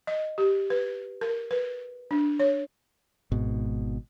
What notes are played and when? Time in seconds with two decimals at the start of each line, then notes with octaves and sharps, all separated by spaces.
0.07 D#5
0.38 G4
0.70 B4
1.21 A#4
1.51 B4
2.11 D4
2.39 C#5
3.32 G#1 G#2 B2